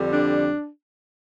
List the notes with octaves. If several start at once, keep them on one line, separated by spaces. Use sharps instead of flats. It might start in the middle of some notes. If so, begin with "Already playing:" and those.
Already playing: F2 D3 G3
D4